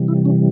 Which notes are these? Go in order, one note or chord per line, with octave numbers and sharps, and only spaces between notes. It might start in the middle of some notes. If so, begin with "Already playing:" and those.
Already playing: C3 E3 G3
E4
C#4